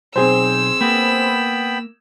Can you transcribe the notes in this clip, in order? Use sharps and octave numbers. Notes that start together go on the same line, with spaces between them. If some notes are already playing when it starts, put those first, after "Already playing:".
B1 C4 G#4 C5 E6
A#3 B3 G5 B5